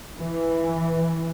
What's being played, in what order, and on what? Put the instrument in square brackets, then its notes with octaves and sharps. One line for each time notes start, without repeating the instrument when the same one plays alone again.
[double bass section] E3